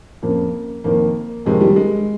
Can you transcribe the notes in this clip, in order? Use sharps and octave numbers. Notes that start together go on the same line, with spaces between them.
F2 C#3 A#3
F2 D#3 A#3
F2 C3 D#3 G#3
G3
G#3